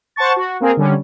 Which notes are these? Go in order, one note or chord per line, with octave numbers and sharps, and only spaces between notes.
C5 F#5 A5 C#6 A6
F#4
A#3 C4 G#4 A#4
D3 G3 C#4